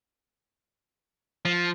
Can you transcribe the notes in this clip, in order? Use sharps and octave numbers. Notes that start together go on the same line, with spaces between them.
F3